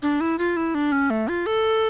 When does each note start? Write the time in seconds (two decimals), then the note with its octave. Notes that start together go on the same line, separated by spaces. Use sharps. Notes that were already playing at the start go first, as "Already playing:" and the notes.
0.02 D4
0.21 E4
0.39 F4
0.57 E4
0.75 D4
0.92 C#4
1.10 A3
1.28 F4
1.46 A4